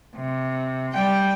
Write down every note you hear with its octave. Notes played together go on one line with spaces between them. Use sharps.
C3
G3 G5